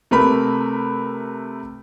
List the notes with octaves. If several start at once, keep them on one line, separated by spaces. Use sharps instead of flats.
C3 A3 A#4 B4 B5